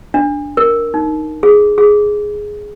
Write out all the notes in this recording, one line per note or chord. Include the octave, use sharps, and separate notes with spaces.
D4
A#4
D#4
G#4
G#4